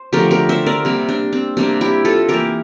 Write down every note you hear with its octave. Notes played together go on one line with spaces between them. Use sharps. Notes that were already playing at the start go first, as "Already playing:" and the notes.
Already playing: C5
D3 F3 A3 G4 A#4
G4 A#4
C5 E5
A#4 D5
C3 G3 A#3
D4
C4
C3 G3 A#3 D4
E4 G4
F4 A4
E3 A#3 G4 A#4